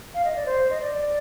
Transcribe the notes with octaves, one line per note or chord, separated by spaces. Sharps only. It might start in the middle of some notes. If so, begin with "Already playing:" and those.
F5
D#5
D5
C5
D#5
D5